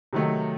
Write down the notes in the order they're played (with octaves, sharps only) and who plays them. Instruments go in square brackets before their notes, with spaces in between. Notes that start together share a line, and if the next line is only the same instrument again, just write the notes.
[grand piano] C3 D#3 F#3 A3